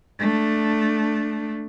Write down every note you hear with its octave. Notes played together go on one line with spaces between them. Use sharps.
A3 D4